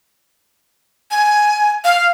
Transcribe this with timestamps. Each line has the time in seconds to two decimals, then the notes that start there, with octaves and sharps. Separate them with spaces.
1.11 G#5
1.84 F5